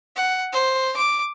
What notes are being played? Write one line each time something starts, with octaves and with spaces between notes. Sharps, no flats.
F#5
C5
D6